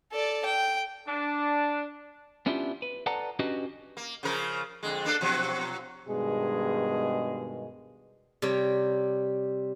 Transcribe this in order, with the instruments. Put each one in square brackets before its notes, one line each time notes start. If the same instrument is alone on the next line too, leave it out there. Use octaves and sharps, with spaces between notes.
[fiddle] A4 D5
G5
[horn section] D4
[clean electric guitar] B3 C#4 D4 E4 F4 G4
B4
A4 B4 D5 F#5 A5 A#5
C#4 D4 F#4 G4 B4 D#5
[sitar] A#3
C#3 F3 A#4
F2 D3 G#3
A#3 D4 A4
B2 F3 F#3
[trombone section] G2 B2 D#3 G#3 G#4
[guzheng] C3 G3 C#5